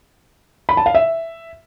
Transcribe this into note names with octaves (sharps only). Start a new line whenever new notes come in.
B5
A5
F5
E5